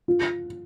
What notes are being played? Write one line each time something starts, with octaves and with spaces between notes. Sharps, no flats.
F4